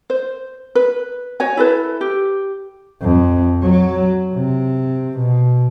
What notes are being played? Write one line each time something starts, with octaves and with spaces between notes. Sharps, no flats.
C5
B4
F#4 C#5 G#5
E4 A4 B4
G4
F2
F#3
C3
B2